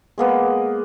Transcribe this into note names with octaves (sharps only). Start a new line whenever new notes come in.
G#3 A#3 B3